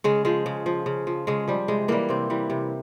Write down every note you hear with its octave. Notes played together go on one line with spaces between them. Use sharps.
C#3 G#3
F3 G#3
C#3
F3
C#3
F3
C#3 G#3
F3 G3
C3 G#3
E3 G3 A#3
C3 C4
E3 G3
C3